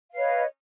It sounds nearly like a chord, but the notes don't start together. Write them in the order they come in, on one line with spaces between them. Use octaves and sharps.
F5 B4 C#5 D#5